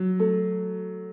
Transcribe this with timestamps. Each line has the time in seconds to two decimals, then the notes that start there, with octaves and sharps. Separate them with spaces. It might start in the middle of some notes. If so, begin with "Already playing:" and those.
Already playing: F#3
0.20 A3